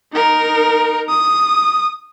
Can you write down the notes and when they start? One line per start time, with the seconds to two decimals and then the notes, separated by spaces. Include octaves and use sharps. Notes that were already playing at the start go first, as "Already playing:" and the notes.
0.13 D#4 A#4
1.09 D#6